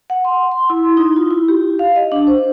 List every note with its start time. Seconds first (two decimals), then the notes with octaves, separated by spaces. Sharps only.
0.10 F#5
0.25 C6
0.51 C6
0.70 E4
0.97 D#4
1.16 F4
1.31 E4
1.48 G4
1.79 F5
1.96 D#5
2.12 D4
2.27 C5